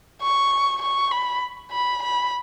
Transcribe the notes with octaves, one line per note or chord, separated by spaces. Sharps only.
C#6
C#6
B5
B5
B5